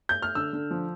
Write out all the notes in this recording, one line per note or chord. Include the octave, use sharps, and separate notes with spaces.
G6
F6
D3 E6
D3
F3